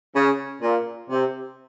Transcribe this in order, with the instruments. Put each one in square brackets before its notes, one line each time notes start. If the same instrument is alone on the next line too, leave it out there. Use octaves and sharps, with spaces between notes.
[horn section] C#3
A#2
C3